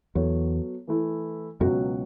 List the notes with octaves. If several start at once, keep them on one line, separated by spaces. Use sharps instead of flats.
E2 F#3 B3 A4 C#5
E3 A3 E4 A4
C#2 F#2 B2 F#3 C#4 F#4